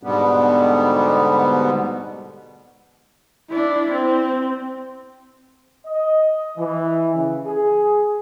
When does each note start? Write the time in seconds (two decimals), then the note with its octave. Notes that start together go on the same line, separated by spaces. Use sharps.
0.03 G#2 B2 D3 G3 B3
3.50 D4 E4
3.92 C4
5.86 D#5
6.57 E3
7.15 C#3
7.46 G#4